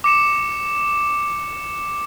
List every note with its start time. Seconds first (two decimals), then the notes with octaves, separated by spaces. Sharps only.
0.04 D6 C#7 E7